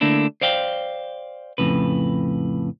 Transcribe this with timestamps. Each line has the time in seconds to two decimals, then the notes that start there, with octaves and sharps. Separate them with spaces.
0.01 D3 A3 A#3 D4 E4
0.41 C5 D5 F5 G5
1.58 F2 A2 C#3 B4